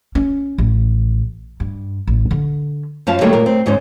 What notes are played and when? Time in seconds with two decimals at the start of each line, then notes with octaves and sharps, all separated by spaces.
0.15 C#4
0.58 A1
1.60 G2
2.07 A1
2.31 D3
3.07 F#2 F3 F5 A5
3.21 D3 F#3 G3 A3 A#3 D#4
3.33 A#2 F4 A#4
3.46 C4
3.66 D2 G#2 E3 C#4 C5